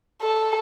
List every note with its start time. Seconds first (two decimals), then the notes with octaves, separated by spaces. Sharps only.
0.22 A4